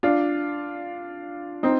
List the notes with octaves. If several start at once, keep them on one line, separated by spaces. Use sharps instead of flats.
D4 F4
C4 D#4